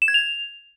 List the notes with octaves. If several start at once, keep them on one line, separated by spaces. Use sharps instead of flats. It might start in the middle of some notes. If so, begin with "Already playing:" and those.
E7
G#6
F7